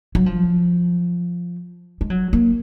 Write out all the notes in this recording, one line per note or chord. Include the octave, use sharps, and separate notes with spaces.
F#3
F3
G#3
F#3
A#3